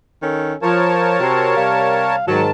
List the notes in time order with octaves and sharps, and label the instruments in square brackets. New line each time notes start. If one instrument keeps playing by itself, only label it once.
[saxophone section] D#3 C#4 A4
[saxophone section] F3 [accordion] A#4 C#5 A5
[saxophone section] C3 C4 F#4
C3 G3 F5
[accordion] G#2 D#3 A5 [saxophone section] F#3